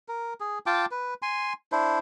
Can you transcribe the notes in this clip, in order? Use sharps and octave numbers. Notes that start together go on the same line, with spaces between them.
A#4
G#4
F4 G5 A5 D6
B4
G#5 C6
D4 E4 C5